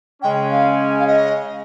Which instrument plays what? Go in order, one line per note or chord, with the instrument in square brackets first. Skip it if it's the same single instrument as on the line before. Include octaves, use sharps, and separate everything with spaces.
[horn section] C#3 G#3 C#4 [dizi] G5
[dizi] F5
F5
D#5